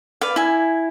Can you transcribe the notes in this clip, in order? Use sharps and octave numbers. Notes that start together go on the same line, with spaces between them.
B4 D5 F5
E4 G#5